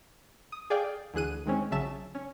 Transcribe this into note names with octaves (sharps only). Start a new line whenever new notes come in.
D#6
G#4 D5 F5 G5
D2 E3 G#4 F#6 D#7
D#3 G#3 C4 C#4
A#1 C#3 F#3 E5 A5 E7
C#4